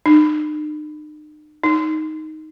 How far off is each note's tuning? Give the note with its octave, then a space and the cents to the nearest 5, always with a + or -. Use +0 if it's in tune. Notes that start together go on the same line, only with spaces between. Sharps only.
D#4 -45
D#4 +5